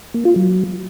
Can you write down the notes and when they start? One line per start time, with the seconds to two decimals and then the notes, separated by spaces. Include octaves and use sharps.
0.14 A#3
0.25 F4
0.36 F#3